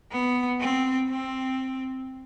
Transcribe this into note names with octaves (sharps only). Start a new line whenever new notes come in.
B3
C4
C4